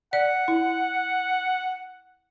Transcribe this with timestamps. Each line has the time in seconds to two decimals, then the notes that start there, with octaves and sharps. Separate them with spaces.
0.13 D5 F#5
0.48 E4